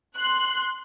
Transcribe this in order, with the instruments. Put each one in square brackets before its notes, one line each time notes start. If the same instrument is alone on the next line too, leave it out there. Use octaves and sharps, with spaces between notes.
[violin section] C6 F#6